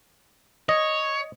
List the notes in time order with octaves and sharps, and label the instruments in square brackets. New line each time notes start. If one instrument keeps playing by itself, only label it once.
[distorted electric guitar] C#5 [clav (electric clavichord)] D#5